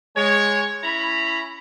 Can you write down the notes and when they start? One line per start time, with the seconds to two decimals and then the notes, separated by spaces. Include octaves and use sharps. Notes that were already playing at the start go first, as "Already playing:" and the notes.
0.16 G#3 C#5
0.83 C#4 E4 A#5 B5